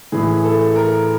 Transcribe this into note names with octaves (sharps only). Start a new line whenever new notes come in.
A2 E3 G#4
A4
A#4